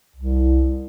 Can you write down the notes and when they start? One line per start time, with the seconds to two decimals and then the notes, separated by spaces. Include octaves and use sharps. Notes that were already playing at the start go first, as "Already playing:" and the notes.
0.16 C2